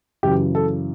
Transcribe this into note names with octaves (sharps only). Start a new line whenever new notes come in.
F#2 C#3 E3 G4
A4